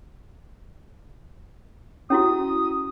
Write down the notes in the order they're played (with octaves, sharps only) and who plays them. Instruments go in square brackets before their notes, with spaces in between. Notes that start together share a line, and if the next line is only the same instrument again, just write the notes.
[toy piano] C#4 E4 F#4 [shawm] D#6